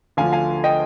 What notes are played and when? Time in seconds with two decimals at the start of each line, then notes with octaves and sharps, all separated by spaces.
0.17 D2 D3 F3 F5 G#5
0.33 F5 G#5
0.64 D#5 G5